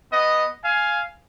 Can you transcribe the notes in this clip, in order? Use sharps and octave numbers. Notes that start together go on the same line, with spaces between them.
B3 D#5
F5 G#5